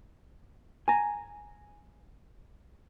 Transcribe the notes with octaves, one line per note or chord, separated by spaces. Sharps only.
G#5 A#5